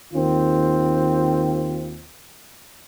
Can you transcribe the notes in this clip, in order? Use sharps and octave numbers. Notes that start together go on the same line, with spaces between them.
D#2 D#3 C4 F4